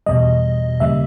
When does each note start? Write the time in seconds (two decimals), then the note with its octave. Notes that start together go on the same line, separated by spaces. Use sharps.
0.06 E2 B2 G3 D#5
0.80 D#2 C#3 G3 A#3 E5